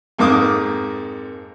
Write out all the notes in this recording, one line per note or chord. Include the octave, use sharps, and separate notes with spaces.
F2 G#2 A#3 D6 D#6